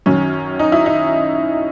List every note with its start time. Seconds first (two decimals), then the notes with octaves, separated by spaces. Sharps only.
0.06 F#2 D#3 F#3 C#4
0.59 D#4
0.72 E4
0.86 D#4